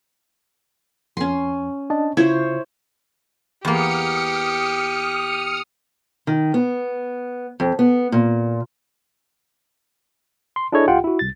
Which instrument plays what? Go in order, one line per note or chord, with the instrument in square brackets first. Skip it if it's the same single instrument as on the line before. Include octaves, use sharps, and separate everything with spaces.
[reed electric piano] F2 [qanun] C#4 C6
[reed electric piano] D4 D#5 A5
[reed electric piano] C#3 F4 [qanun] E4 C5 C#5
[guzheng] E2 A#3 [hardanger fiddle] G4 [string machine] D#6 F6 C#7
[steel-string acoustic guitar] D#3
B3
F2
B3
A#2
[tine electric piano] C6
D4 E4 G#4 A4 C#5 D#5
C#2 F4 G4 F#5 G5
E4 F#4
C2 A6